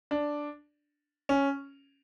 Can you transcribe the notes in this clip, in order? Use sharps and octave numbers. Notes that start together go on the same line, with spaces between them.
D4
C#4